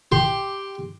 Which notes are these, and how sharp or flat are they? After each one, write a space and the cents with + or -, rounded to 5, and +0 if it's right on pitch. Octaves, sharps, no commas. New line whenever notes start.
G4 +0 C6 +0